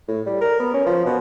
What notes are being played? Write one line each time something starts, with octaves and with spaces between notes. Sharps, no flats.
A2
G3
A#4
B3
C#4
F3
B2